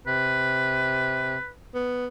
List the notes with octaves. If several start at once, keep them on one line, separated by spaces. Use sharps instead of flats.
C3 B4
B3